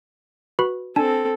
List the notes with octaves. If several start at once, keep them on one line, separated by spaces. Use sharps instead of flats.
F#4 B4 B5
C4 D4 A4 G#5 A5